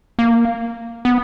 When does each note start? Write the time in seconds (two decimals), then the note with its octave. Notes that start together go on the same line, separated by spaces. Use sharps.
0.19 A#3
1.05 B3